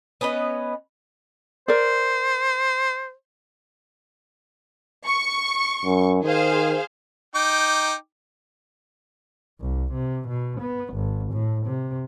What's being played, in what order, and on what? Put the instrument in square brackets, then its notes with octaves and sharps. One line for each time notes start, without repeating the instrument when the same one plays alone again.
[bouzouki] B3 C#4 B4 D#5
[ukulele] A#4 D5 [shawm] C5
[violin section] C#6
[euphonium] F#2
[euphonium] D#3 [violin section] G#4 C5 F5
[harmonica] D#4 G5 D6
[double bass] C2
C3
B2
B3
G#1
A2
C3